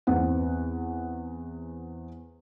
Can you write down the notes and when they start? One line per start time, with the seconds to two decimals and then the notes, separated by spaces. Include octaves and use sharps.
0.07 E2 C4 F#5